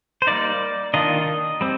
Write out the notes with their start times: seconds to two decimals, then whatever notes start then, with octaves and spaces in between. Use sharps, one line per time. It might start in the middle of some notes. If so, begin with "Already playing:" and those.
0.22 C5
0.27 G3 A#3 D#4 D5
0.94 D#3 A#3 D4 F4 D#5
1.61 G3 C4